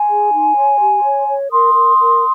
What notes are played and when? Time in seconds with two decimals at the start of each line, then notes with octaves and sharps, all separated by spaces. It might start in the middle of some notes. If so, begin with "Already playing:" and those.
Already playing: G#5 C6
0.08 G#4
0.32 D#4
0.56 C#5
0.79 G4
1.02 C#5
1.27 C#5
1.50 A#4 C6 D#6
1.73 A#4
1.97 A#4